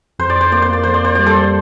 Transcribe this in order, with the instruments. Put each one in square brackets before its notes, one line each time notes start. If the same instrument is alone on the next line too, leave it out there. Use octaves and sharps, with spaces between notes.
[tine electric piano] F2 [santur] C5
[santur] D5
[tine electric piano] F2 [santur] C5
[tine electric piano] A#3 [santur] D5
[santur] C5
[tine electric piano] A#3 [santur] D5
[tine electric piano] F2 [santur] C5
[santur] D5
[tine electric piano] A#3 [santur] C5
[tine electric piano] G3 [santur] D5
[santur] A4 C5
[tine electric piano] G3